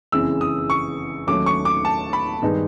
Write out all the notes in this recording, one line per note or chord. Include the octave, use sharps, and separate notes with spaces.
F#1 F2 C#3 E3 G#3 E6
D#6
C#6
D#2 D#3 F#3 A3 C#4 D6
C#6
D6
A5
B5
G2 D#3 G#3 B3 D#4